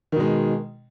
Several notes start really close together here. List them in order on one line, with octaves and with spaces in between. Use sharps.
D#3 B2 G#3